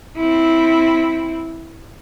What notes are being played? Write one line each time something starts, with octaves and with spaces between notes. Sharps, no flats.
C4 E4